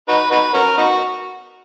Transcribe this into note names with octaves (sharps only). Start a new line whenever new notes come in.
D#4 F#4 B4
D#4 F#4 B4
C#4 F#4 A#4
B3 D#4 F#4